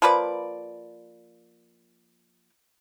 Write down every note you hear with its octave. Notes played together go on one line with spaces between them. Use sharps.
F3 A#3 B4 D5